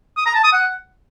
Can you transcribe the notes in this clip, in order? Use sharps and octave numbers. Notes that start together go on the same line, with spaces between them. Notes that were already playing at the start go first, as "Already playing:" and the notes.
D#6
A#5
A5
D#6
F#5